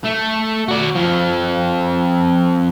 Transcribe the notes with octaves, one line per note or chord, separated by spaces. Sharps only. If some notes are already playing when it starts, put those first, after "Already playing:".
A3
F#4 D5
F2 F3